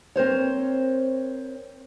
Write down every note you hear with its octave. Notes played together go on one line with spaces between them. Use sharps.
C4 A#4 C5 C#5